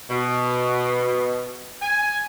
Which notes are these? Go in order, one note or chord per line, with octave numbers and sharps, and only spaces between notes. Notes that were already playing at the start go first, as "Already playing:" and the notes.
B2
G#5